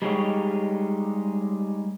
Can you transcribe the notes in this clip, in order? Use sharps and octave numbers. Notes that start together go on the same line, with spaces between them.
G3 G#3 D#4 G4 C#5